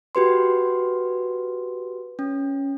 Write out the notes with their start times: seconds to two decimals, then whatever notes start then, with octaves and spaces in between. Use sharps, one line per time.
0.15 F#4 G4 B4 C6
2.19 C#4